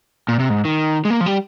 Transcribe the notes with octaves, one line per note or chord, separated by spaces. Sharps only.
A#2
C3
G#2
D#3
G#3
A#3
F3
G3